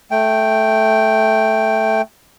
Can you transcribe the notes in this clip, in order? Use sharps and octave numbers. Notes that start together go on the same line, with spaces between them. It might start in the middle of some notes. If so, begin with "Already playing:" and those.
A3 G5